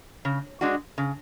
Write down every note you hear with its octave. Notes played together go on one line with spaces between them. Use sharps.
C#3
G#3 D4 F#4
C#3